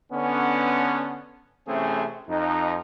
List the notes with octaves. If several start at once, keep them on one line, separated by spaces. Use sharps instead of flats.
D3 B3 C#4
C3 E3 A3 C4 C#4 G#4
F2 D#4